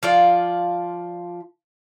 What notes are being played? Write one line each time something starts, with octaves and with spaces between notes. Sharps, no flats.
F3 F4 D5